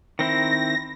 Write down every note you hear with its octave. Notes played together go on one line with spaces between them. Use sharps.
D#3 C4 E4 A#6